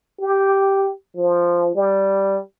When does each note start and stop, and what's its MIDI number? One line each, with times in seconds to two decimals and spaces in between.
0.21 0.89 67
1.16 1.75 53
1.75 2.38 55